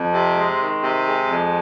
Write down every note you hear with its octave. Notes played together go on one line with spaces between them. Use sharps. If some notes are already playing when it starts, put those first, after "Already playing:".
Already playing: F2
C3
G#3
D#3
C3
G#3
F2